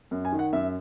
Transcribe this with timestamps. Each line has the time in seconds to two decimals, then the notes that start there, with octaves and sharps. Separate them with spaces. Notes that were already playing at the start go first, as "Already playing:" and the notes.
0.11 F#2
0.25 G#5
0.33 D#3
0.39 F#5
0.53 F#2 E5